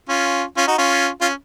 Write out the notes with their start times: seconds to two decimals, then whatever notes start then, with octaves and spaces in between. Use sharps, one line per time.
0.09 C#4 F4
0.57 C#4 F4
0.67 D#4 F#4
0.78 C#4 F4
1.21 C#4 F4